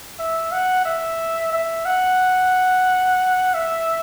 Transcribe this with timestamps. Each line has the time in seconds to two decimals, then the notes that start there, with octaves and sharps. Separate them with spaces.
0.20 E5
0.53 F#5
0.86 E5
1.53 E5
1.86 F#5
3.54 E5